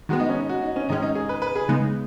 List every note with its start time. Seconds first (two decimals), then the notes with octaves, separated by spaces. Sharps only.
0.09 D#3 G#3 B3 F#4
0.20 D#4
0.29 C#4
0.40 D#4
0.49 F#4
0.62 D#4
0.76 C#4
0.89 G#2 D#3 G#3 C#4 D#4
1.03 D#4
1.15 G#4
1.29 B4
1.42 B4
1.55 G#4
1.69 C#3 G#3 B3 D#4